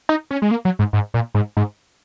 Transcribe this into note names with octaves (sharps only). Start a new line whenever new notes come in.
D#4
C#4
G#3
A#3
F#3
G#2
G#2
A#2
G#2
G#2